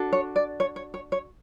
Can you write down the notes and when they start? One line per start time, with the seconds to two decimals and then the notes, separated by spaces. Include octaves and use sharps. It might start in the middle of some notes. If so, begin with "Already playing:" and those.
Already playing: D4 F#4 A4
0.13 C#5
0.36 D5
0.60 C#5
0.76 C#5
0.94 C#5
1.12 C#5